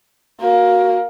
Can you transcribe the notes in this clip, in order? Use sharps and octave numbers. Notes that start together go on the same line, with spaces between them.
A#3 F#4